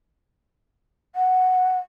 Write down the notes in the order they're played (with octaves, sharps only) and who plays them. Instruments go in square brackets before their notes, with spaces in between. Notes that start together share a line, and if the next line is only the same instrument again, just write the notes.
[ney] F#5